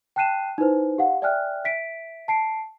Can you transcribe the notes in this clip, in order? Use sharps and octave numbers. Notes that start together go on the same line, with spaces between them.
G5 A5 F#6 C7 D#7 E7
D#4 E4 B4 C5
G4 F5 F#5
D5 E5 G5 G#5 F6 F#6
E5 B6 D7
A5 C7 D7